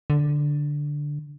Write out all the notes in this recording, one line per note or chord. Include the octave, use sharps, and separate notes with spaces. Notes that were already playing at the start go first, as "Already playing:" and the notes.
D3